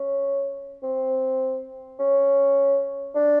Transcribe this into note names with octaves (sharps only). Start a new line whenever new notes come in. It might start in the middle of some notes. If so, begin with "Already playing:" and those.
Already playing: C#4
C4
C#4
D4